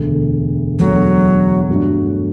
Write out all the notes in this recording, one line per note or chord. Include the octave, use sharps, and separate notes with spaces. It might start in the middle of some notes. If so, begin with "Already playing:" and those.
Already playing: E1 D2 D3
E1 D2 D3 F#3
G2 F#3 A3 D4